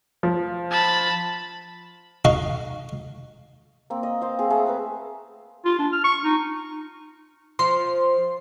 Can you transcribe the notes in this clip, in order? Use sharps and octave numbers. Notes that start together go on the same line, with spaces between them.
F3
A5 B5
D#4 F#4 F5 A#5
A#3 C4
D#5
C5 F5 C6
C4 G#4
A3 G#4 F#5
A#4 B4 E5 A5
F4
D4
F6
C#6
D#4
F3 C6